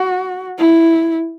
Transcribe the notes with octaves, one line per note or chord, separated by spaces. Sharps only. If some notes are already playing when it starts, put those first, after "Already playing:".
Already playing: F#4
E4